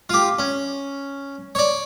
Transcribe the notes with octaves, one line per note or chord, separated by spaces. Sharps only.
F4 G4
C#4
C#5 D5